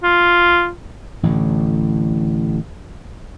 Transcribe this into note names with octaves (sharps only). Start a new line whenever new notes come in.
F4
A1 A2 D3